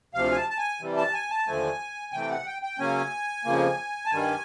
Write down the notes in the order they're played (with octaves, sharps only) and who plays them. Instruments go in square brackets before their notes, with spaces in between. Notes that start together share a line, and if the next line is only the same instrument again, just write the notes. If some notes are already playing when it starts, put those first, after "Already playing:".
[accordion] D2 C3 F3 F5
G#5
A5
A5
G#5
C3 E3 G3
A5
G#5
A5
D#2 D3 F3 A3 G#5
C3 E3 A3 G5
F#5
G5
G5
C#3 F#3 A#3 C#4 G#5
F2 C#3 F3 A#3
A5
G2 D#3 G3 G#5